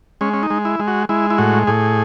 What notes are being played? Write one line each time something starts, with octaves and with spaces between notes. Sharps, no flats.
G#3 C#4
C#4
D#4
G#3
E4
G#3
F#4
G#3 E4
E4
A2 F#4
A2 G#4